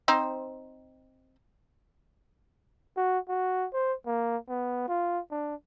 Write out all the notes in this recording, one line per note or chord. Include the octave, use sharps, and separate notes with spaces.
C4 D#4 C5
F#4
F#4
C5
A#3
B3
F4
D4